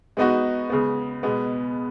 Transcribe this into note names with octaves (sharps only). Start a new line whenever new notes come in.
G#3 B3 D#4 F#4
C#3 G#3 B3
B2 G#3 B3